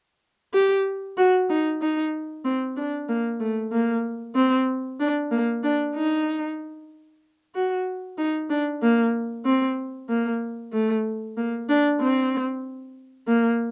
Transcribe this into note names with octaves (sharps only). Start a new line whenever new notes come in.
G4
F#4
D#4
D#4
C4
D4
A#3
A3
A#3
C4
D4
A#3
D4
D#4
F#4
D#4
D4
A#3
C4
A#3
A3
A#3
D4
C4
A#3